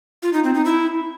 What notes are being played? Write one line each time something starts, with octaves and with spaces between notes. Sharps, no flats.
F4
D#4
C4
D#4
E4